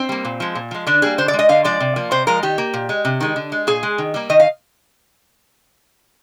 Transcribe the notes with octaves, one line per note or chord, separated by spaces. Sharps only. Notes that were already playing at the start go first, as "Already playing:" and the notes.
Already playing: C4
G3 A#3
A#2
F3 G#3
A#2
F3 G#3
D3 D4
G3 A#3 G#4
D3 C5
D5
G#3
D#5
D3 F5
F3 G#3 D5
C3
F3 A#3
C3 C5
F3 G#3 A#4
D#3 G4
A#3
A#2
G#3
C3
D#3 G#3
D3
G#3
A#2 G#4
G#3
D#3
G3 A#3
D#3 D#5
F5